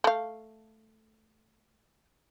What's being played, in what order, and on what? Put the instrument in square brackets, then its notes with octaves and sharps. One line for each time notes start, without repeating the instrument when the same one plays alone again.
[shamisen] A3 F5